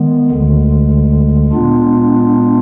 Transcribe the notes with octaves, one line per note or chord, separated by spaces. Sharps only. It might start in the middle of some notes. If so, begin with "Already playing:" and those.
Already playing: D#3 G#3 B3
D2 D3 G#3
A#2 G#3 B3 D4 F4